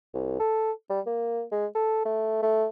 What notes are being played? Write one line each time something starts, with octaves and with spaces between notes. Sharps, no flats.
C2
A4
G3
A#3
G#3
A4
A3
A3